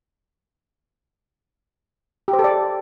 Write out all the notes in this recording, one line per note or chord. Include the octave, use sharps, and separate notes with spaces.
G4
C5
A4
D5